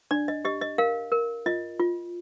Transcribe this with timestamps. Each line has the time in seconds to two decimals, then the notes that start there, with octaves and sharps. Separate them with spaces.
0.11 D4 D5
0.28 D#5
0.45 G4 D#5
0.61 D#5
0.78 A#4 F5
1.12 A#4
1.46 F4 D#5
1.80 F4